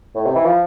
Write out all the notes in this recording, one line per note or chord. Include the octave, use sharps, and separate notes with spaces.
A2
C3
E3
F3